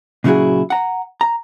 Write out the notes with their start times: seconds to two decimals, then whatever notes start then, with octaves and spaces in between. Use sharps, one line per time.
0.24 A#2 C#3 F#3 E4 F#4 G#4
0.70 F#5 A#5
1.21 A#5